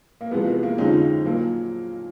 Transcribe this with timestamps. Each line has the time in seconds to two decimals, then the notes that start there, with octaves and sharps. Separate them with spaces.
0.21 A#3
0.31 E2 C3 F3 G#3 B3
0.48 B3
0.63 A#3
0.78 F2 D3 F3 G#3 C#4 D#4
1.25 A#2 F#3 A#3